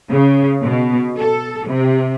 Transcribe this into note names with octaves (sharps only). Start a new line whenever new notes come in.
C#3
B2
A4
C3